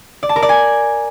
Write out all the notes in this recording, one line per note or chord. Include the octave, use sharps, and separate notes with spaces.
D5
A5
A#4
D5
G#5